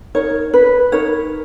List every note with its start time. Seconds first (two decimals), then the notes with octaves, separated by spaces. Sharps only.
0.15 D#4 A#4 C#5
0.54 B4
0.92 D#4 A#4 C#5